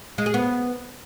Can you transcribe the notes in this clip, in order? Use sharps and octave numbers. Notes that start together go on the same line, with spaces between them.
G#3
G#4
B3